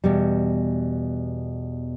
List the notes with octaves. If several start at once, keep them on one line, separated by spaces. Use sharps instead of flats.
E2 B2 G3